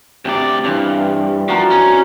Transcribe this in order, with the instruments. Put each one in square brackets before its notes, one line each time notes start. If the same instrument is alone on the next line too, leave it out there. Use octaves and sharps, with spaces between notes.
[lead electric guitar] D2 D5 [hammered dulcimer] C3
[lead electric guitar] G2 [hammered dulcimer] E3 C4 D4
[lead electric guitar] F3 [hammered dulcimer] F#4 A#4 C5
[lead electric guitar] C#4